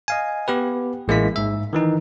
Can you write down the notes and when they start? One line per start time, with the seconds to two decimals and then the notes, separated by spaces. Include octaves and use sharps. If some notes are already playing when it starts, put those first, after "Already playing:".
0.08 D#5 F5 G#5
0.48 B3 G4 B4
1.08 A1 G#3 A#3 E4 B6
1.36 G#2 E5
1.73 D#3 E3 D#4